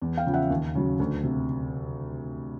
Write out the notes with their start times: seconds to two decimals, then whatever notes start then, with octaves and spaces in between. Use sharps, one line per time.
0.02 E2
0.17 F5 G5
0.26 C#3 F3
0.34 E5 F#5
0.50 D#2
0.75 C#3 F#3
0.99 D2
1.23 C3